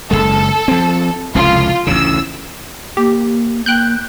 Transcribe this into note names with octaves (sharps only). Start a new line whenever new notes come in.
F#1 E2 G#3 A4
F3 C4
F1 C#2 A2 F4
A1 D2 C#3 E6
A#3 G4
A#3 G5 F#6 G6